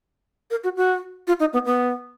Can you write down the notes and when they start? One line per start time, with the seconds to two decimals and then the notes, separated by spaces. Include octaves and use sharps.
0.51 A#4
0.64 F#4
0.77 F#4
1.27 F4
1.40 D#4
1.53 B3
1.66 B3